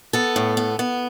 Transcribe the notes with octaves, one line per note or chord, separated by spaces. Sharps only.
B3 A4
A2
B3
B3